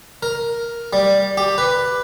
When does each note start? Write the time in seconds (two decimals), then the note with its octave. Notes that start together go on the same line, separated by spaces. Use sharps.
0.23 A#4
0.93 G3
1.37 G4
1.58 B4